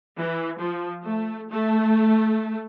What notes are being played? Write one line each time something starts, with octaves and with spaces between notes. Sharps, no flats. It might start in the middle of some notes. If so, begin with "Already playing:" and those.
E3
F3
A3
A3